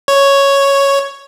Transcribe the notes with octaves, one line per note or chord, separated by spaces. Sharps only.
C#5